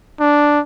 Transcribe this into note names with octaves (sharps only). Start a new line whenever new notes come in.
D4